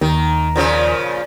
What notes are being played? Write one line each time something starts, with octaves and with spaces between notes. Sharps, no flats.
D#2 D#3
A#2 C#3 F3